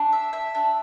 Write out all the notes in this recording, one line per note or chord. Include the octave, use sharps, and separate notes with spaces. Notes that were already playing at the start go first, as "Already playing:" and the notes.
Already playing: D4
E5
E5
D4